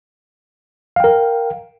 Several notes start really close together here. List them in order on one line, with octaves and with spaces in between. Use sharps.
F5 G5 A#4